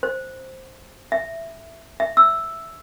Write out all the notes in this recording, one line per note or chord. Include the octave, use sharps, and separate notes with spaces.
C5
E5
E5
E6